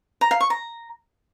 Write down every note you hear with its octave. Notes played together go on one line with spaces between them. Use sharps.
A#5
F5
C#6
A#5